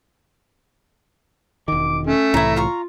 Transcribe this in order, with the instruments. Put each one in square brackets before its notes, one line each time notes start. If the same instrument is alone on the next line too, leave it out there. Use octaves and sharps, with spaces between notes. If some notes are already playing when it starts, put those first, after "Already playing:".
[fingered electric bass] E1 D#3 [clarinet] D6
[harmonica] A3 [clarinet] C#4
[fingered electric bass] C2 A2 E3 [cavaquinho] E4 A#5
[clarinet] F4 [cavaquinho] F5 A#5 C#6